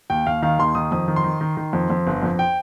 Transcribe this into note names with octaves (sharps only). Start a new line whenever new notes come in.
D#2 G5
D#2 F5
D#3 F5
D#2 C6
D#3 D#6
F2 D#6
D#3
C6
D#3
D#3
D#3
F2
F2
G1
F2
G5